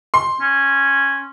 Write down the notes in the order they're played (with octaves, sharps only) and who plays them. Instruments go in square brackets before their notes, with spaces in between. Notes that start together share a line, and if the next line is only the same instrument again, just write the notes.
[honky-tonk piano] C6
[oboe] C#4